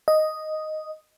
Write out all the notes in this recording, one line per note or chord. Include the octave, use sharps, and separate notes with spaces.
D#5